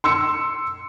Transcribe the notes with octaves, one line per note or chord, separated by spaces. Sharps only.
C6 E6 C#7